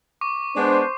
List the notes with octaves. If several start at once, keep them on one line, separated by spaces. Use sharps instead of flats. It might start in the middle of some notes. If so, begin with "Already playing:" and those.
C#6 D6
G#3 B3 D4 C5